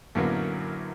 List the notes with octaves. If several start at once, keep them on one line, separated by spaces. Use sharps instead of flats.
F#2 A2 D3 F#3 A#3 B3